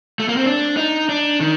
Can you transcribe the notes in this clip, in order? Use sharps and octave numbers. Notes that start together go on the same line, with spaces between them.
A3
A#3
C4
D4
D#4
D4
D#3